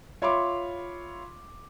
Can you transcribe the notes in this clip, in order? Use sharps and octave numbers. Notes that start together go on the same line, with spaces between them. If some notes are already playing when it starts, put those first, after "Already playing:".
F4 C#5 E5 B5 C6 D6